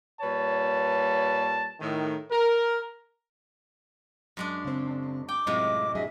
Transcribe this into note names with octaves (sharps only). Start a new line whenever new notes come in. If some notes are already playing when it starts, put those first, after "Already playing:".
A#2 G3 B4 C#5 A5
A2 D#3
A#4
F#2 G#3 D4
C#3 C4
G5 D6
F#2 A2 C3 G#3 C4 F4 D#5
F#3 D4 G#4 E5